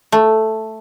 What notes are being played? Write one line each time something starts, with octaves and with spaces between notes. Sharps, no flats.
A3